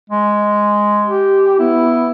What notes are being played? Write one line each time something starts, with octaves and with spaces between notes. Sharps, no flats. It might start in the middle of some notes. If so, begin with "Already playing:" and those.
G#3
G4
B3 E4